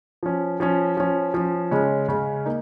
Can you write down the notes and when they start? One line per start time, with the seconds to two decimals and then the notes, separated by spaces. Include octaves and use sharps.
0.23 F3 C#4
0.60 F3 C#4
0.97 F3 C#4
1.34 F3 C#4
1.71 C#3 G#3 C#4
2.08 C#3 G#3 C#4
2.46 A#3 D#4